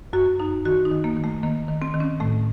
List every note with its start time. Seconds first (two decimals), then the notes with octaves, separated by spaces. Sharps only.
0.13 F#2 F#4
0.40 F#2 D#4
0.65 D#3 F#4
0.85 D#4
0.91 D#3
1.04 A#3
1.17 D#3
1.24 A3
1.43 D#3 A#3
1.68 D#3
1.82 C4
1.94 D#3
2.00 C#4
2.20 A2 A3